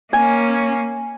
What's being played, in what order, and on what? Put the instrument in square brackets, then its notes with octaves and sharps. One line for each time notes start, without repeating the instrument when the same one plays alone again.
[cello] A#3 C#4 [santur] G#5